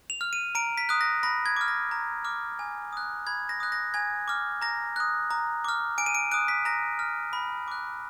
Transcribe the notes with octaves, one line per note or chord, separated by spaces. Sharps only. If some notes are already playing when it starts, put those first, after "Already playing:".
F7
F6
D#7
A#5 D7
B6
D#6 F#6
A#6
B5 A#6
G#6
D6 F6
A#6
A#5
D6 F6
G#5
D#6 F#6
B5 G#6
A#6
D#6 F#6
A#6
G#5 G#6
D6 F6
A#5 A#6
D#6 F#6
A#5
D6 F6
G#5 D7
D#7
D7
D#6 F#6 D7
B6
A#5 A#6
F6
B5
D6 F#6